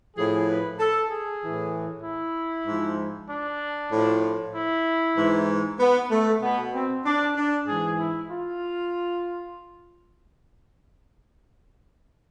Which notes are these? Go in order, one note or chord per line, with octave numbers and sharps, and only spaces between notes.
A2 F3 G#4
B4
A4
G#4
A2 E3
E4
G#2 F3
D4
A2 F3
E4
G#2 E3
B3
A3
B2 B3
C4
D4
D4
G#2 E3 G#4
E4
F4